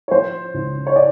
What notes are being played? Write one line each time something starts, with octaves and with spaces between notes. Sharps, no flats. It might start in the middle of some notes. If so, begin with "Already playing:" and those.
C#5
F3 C5
C#2
C#5
D5